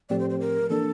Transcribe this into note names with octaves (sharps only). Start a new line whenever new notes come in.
A2 F3 A3 C4 G4 D5
C5
C5
A#4
E3 A#3 D4 A4